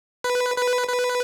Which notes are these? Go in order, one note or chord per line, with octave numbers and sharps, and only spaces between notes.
B4
B4
B4